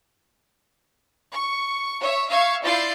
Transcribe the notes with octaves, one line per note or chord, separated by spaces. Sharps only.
C#6
C#5 E5
E5 F5 C#6 G#6
E4 F4 D5 G6 A6 C7